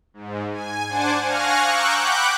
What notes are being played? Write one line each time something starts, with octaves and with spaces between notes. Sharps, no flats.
G#2
G#5
D4 C5 F#5 G#5 A5 D6
F5 G#5 C#6 F6 F#6 A#6
A#5 C#6 D6 E6 F#6 G6
F#5 G5 B5 D6 F#6 G6